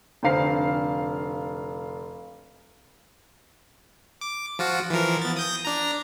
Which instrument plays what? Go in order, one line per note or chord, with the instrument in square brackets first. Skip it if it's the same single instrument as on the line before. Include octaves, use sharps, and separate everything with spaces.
[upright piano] F1 D3 C5 F5 C7
[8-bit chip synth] D6
F3 F4 F#4
E3 F3 A#4
B3 A6
D#6 G6 A#6
D4 A#5